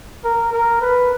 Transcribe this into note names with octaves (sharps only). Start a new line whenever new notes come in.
A#4
A#4
B4